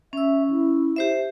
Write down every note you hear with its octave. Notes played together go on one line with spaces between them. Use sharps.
C#4 E5 E6
E4
G4 C5 E5